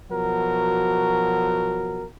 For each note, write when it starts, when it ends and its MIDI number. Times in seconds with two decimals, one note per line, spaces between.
0.11 2.04 47
0.11 2.04 53
0.11 2.04 54
0.11 2.04 66
0.11 2.04 70